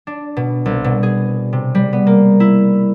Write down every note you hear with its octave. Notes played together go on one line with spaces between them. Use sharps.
D4
B2
C2
B2
G#4
C3
G3
B3
A#3
E4